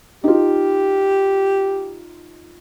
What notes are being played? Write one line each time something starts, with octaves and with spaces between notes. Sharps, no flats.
D#4 F4 G4